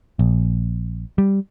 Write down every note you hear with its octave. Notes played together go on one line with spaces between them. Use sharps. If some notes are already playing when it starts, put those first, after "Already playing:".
A#1
G3